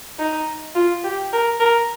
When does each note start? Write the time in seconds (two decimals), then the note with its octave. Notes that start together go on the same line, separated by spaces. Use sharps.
0.19 D#4
0.75 F4
1.04 G4
1.33 A#4
1.60 A#4